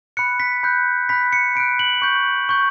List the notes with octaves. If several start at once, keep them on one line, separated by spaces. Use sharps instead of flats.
B5 F#6 C#7
B6
B5 F#6 G6
B5 F#6 B6
C#7
B5 F#6 D7
F#7
C#6 G6
C#6 G6